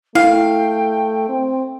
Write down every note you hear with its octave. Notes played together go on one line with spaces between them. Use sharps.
A3 E4 F5 G5
C4